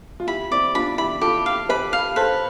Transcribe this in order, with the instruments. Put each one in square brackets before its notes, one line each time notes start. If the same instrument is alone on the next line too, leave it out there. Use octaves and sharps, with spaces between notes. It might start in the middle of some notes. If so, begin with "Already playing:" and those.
[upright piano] F4
[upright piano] E4 G4 [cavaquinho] B5
[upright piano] C4 E4 [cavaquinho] D5
[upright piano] D4 F4 [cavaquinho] B5
[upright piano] E4 G4 [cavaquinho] B5
[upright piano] F4 A4 [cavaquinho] G4
[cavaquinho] F5
[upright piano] G4 B4 [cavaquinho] B5
[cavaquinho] F5
[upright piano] A4 C5 [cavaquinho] B4